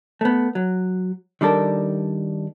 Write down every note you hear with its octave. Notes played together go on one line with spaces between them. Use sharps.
A3 B3
F#3
D#3 G3 D4 A4 A#4